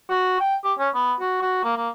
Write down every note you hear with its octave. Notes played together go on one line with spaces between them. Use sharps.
F#4
G5
G4
C#4
B3
F#4
F#4
A#3
A#3